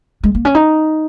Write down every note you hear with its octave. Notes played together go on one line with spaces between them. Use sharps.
G#3
A#3
C#4
D#4